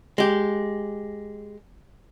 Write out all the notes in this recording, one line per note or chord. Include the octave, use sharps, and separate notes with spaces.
G#3 G4